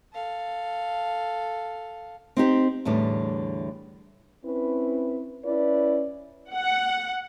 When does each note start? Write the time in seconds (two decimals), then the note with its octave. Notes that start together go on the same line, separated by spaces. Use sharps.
0.13 A4 F5
2.37 C4 D#4 G4 C5
2.85 E2 A2 D3 G3
4.44 C4 C#4 E4 B4
5.43 C#4 E4 B4 D5
6.53 F#5